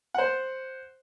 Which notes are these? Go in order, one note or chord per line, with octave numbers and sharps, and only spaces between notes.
C5 F#5